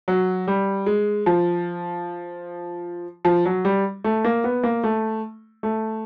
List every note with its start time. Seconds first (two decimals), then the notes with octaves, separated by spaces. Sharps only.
0.08 F#3
0.48 G3
0.86 G#3
1.26 F3
3.25 F3
3.46 F#3
3.65 G3
4.04 A3
4.25 A#3
4.44 B3
4.64 A#3
4.84 A3
5.63 A3